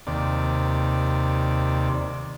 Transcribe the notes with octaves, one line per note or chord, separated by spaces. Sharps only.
D#2 C3 D5